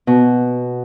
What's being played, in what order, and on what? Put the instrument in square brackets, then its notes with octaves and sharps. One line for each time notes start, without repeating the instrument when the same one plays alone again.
[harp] B2